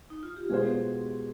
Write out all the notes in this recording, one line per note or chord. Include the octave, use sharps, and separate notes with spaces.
D#4
F4
G4
B2 G#3 B3 F4 G#4 C5